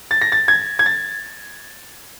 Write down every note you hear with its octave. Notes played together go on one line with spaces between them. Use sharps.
A6
A#6
A6
G#6
G#6
A6